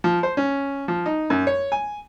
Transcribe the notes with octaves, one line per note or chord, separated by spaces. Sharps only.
F3
C5
C#4
F3
D#4
F#2
C#5
G#5